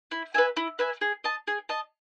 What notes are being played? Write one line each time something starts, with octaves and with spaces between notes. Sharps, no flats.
E4
B4 E5 G#5
E4
B4 E5 G#5
G#4
D#5 A5
G#4
D#5 A5